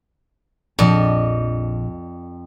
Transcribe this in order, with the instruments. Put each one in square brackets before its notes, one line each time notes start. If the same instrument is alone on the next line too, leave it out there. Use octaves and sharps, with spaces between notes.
[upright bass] A#1 D4 [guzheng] F2 D5 D#5